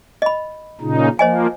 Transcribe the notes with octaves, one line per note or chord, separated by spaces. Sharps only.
D#5 B5
A#2 C#3 D#4
F3 A#3 C5 D#5 G#5